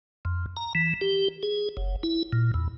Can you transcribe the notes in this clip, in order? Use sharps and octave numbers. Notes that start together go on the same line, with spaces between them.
F2
A#5
E3
G4
G#4
F#1
E4
A#2
E2